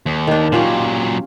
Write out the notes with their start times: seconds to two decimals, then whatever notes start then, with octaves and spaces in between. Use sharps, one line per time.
0.06 D#2
0.27 D#3 D4
0.52 A#2 F#3 C#4 F4 G4